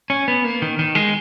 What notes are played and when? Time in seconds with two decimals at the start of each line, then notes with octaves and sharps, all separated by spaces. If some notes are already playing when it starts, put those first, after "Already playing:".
0.10 C#4
0.28 B3
0.44 A#3
0.62 D#3
0.79 D#3
0.95 G#3